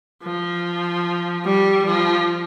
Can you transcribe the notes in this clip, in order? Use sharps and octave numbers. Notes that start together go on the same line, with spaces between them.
F3
G3
F3